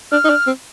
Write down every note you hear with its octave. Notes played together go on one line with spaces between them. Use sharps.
D4 F6
D#4
D4
C4